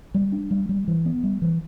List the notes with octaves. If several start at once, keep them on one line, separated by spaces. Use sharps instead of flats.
G3
D4
G3
G3
E3
B3
G3
E3